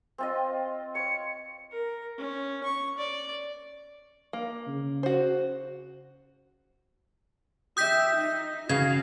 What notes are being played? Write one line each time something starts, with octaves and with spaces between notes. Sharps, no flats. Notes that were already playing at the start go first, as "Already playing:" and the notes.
C4 F4 D#5
C#5 C#7
A#4
C#4
C#6
D5
A#3
C#3
F#4 C5
G4 E5 D#6 G6 B6
D#4
C#3 F#4 F5 G#6